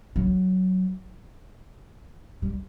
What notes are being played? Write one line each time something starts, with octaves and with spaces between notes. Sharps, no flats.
F#3
G3